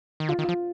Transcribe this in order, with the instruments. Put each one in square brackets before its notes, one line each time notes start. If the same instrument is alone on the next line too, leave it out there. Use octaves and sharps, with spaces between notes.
[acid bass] D#3
[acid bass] D3 [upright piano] F4
[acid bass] D#3
[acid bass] F3 [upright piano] F4